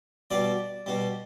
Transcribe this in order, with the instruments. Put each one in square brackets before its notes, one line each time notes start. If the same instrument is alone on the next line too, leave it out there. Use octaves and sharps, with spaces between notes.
[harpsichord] B2 G3 D5
B2 G3